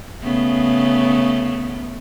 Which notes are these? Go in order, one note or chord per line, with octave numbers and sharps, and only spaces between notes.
C#3 A3 B3